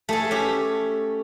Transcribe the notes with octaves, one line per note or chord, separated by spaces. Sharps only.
A3 G#4 A4
C#4 G4